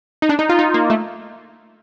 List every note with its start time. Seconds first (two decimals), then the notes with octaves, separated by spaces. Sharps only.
0.22 D#4
0.29 D4
0.39 D#4
0.49 F4
0.59 D#4
0.74 A#3
0.90 A3